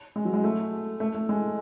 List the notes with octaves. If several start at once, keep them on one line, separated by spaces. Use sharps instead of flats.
G#3
F#3
G#3
A3
A3
A3
G#3